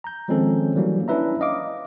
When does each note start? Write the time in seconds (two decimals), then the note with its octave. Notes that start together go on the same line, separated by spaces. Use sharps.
0.04 A#5 G6
0.28 D#3 F3 G#3 C4 C#4 A4
0.75 E3 F#3 G3 A#3 C#4 D4
1.08 C#4 D4 E4 B4 E5 A#5
1.41 D#5 F5 D6